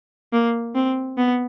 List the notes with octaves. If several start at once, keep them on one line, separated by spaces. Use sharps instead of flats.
A#3
C4
B3